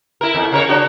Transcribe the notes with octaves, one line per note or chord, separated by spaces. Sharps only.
E4 A#4
E2
C#3 A#4 C#5
D4 F#4